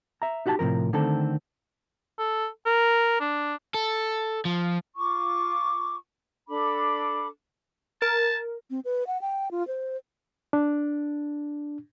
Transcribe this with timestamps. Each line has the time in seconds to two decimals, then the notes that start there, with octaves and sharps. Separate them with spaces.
0.22 E5 A#5
0.46 D#4 F#4 G4 F#5 A5
0.59 A2 C3 F3 A#4
0.93 D3 D#3 A3 C4 A4
2.19 A4
2.66 A#4
3.21 D4
3.74 A4
4.45 F3
4.96 F4 C#6 D6
6.48 D4 A4 B5 D6
8.02 A#4 A5
8.70 C4
8.85 B4
9.07 F#5
9.21 G5
9.51 F4
9.68 C5
10.53 D4